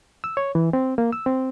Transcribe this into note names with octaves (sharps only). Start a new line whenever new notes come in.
E6
C#5
E3
C4
A#3
E6
C4